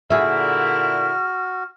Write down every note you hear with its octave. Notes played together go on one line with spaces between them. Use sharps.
A#2 D3 E4 F#4 G#4 E5 F6